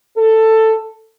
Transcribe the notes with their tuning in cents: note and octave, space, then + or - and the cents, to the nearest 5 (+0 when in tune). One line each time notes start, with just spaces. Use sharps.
A4 +10